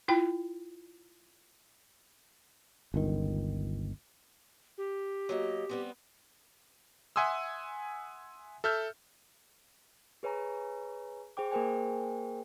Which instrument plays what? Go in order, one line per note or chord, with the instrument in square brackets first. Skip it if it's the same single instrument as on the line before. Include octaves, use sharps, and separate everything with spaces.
[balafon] E4 F4 G5
[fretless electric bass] G1 C#2 D#3
[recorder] G4
[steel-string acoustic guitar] F#3 A#3 D#5
G3 B3 C4
[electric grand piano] E5 F#5 G#5 C6 D#6 E6
A4 E5 F6 G6
[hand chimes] G#4 B4 C#5 G#5 A#5
G#4 C5 G5 D6
A#3 G#4 A#4 C5 G5 G#5